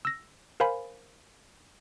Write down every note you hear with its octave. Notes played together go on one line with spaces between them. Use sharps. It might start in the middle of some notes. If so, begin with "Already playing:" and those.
E6 A#6
A#4 C5 F5 G#5 B5